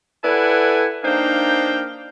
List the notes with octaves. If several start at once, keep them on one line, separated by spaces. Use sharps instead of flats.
E4 A4 B4 D5 F#5 G#5
A#3 D4 D#4 C5 F5 G5